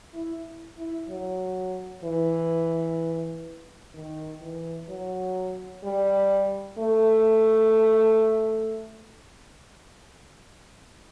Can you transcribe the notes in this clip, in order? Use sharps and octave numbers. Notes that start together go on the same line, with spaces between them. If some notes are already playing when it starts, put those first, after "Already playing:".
E4
E4
F#3
E3
D#3
E3
F#3
G3
A3